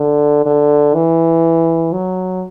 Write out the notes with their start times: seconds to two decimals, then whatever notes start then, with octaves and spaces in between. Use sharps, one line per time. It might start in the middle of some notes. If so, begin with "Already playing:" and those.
Already playing: D3
0.46 D3
0.94 E3
1.93 F#3